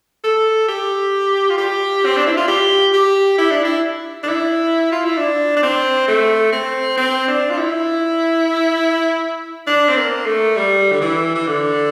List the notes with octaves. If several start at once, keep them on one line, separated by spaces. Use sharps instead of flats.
A4
G4
F4
G4
C4
D4
E4
F4
G4
G4
E4
D4
E4
D4
E4
F4
E4
D4
D4
C4
A3
C4
C4
D4
F4
E4
D4
C4
A#3
A3
G3
D3
E3
E3
D3